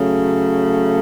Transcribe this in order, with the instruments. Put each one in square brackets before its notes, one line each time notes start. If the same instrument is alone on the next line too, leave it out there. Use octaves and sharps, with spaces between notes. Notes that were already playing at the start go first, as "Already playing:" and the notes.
Already playing: [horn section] C#3 F#3 A3